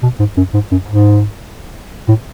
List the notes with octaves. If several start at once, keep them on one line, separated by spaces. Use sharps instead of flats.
B2
G#2
F#2
G#2
F#2
G#2
A2